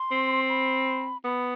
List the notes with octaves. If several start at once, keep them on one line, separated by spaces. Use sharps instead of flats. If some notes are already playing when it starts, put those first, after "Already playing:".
Already playing: C6
C4
B5
B3 B5